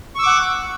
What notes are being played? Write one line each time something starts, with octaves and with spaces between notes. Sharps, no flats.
F#5 C#6 D6 E6